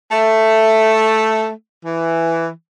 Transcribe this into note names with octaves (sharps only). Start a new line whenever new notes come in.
A3
E3